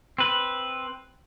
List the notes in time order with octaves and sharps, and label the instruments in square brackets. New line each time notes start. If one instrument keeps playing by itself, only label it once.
[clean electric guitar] C4 B4